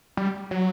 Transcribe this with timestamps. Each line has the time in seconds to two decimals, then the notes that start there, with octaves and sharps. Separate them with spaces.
0.17 G3
0.51 F#3